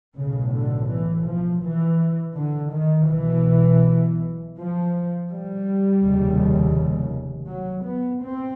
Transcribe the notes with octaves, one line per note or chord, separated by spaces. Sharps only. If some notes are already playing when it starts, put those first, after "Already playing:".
B1 A2 C#3
D3
E3
F3
E3
D3
D#3
B1 B2 E3
F3
G3
F1 D#2 C#3
F#3
B3
C4